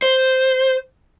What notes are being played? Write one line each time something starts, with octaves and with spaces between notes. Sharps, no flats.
C5